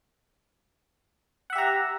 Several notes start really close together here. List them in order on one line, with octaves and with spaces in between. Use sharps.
F#5 E5 G4 A#5